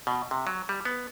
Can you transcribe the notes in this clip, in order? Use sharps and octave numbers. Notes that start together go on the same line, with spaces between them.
B2
C3
F#3
G3
B3